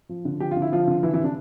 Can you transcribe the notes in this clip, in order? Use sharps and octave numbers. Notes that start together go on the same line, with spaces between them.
F3
D3
F3 G4
F4
D3
E4
F3 F4
D3
E3 E4
E3 E4
C3
D4